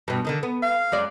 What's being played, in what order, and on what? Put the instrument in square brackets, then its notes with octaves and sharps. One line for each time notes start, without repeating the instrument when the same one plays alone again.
[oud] G2 B2
D3 D#3 D#4
B3
[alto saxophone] F5
[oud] F#2 G#3 D5